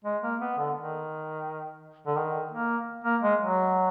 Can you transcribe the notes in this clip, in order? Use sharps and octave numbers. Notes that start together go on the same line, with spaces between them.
G#3
A#3
B3
D3
D#3
D3
D#3
A#3
A#3
G#3
F#3